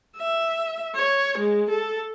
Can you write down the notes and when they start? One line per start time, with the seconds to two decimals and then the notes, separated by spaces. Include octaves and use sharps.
0.17 E5
0.95 C#5
1.37 G#3
1.69 A4